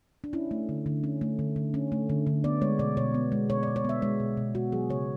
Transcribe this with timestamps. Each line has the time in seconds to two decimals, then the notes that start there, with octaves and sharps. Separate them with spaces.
0.24 D4
0.33 C#4 E4
0.51 A3
0.69 D3
0.86 D3
1.04 C#4
1.21 A3
1.39 D3
1.56 D3
1.74 C#4
1.92 A3
2.10 D3
2.27 D3
2.44 B3 D5
2.62 G#3 C#5
2.79 B2 D5
2.97 B2 C#5
3.14 B3
3.32 G#3
3.49 B2 C#5
3.63 D5
3.67 B2
3.76 C#5
3.85 B3 E5
4.02 G#3 C#5
4.20 B2
4.37 B2
4.55 B3 F#4
4.72 F#3 G#4
4.90 C#3 C#5